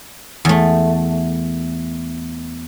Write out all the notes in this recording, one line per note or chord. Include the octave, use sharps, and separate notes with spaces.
E2 A3